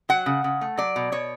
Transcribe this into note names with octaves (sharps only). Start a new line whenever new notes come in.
F#3 F#5
C#3
C#3
A3
F#3 D5
B2
B2 C#5